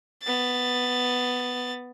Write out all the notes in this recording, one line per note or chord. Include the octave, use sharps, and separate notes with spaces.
B3 A6